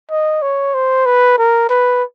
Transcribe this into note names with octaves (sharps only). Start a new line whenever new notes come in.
D#5
C#5
C5
B4
A#4
B4